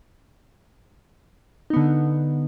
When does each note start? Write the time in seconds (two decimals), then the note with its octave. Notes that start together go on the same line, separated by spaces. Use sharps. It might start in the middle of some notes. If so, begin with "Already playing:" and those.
1.70 D#4
1.73 B3
1.77 D3